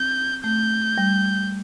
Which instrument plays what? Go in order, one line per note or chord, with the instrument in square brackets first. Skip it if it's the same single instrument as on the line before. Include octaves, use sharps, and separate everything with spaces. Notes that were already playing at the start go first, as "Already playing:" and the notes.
Already playing: [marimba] C4 [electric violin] G6
[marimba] A3 [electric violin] G6
[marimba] G3